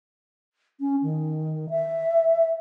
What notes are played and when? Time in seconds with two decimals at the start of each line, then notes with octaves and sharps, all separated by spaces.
0.80 C#4
1.03 D#3
1.70 E5